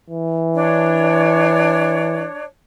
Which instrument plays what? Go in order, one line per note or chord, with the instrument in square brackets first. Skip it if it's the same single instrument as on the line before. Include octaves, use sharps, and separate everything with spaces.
[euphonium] E3
[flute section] D4 C#5